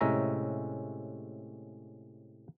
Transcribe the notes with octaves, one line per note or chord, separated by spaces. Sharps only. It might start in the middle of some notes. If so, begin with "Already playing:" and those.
A2 C3 G#3 C#4 E5 A#5